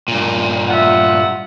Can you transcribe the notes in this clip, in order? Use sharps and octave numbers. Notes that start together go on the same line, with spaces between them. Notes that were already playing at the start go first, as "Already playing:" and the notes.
G2 A#2
F4 E5 F#5